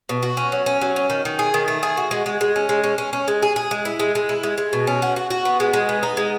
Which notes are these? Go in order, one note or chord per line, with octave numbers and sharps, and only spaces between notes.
B2
F#4
C#4
F#3
C#4
F#3
C#4
D#3
D#3
G#4
D#3
A3
G#4
F#4
G#3
G#3
G#3
C#4
G#3
C#4
C#4
C#4
G#3
G#4
G#4
G#3
E4
G#3
G#3
E4
G#3
G#3
B2
C#4
F#4
F#4
F#4
B3
G#3
G#3
B3
D#4
G#3